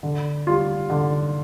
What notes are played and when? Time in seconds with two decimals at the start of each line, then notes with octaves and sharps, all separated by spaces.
0.03 D3
0.47 G3 F4
0.90 D3